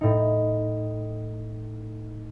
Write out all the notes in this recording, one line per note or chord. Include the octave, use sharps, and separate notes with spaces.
A2 D#4